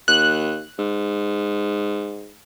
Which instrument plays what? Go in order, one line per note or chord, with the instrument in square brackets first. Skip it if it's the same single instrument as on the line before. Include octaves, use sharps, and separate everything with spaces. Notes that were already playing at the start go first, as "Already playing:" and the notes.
[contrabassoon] D#2 [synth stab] F#6
[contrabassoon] G#2